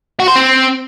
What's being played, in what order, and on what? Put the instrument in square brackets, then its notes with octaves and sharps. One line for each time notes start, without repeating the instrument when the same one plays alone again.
[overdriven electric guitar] F#4
C5
C4